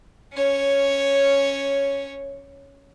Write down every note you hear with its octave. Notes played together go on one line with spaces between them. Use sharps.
C#4 C#5